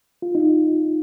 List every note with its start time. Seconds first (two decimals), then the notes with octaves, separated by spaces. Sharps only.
0.22 F4
0.35 D#4